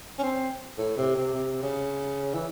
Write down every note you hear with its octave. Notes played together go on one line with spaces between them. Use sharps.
C#4
C4
A2
C3
C3
C3
C#3
E3